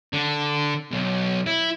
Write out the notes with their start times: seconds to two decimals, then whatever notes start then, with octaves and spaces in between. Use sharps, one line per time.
0.13 D3
0.92 B1
1.47 E4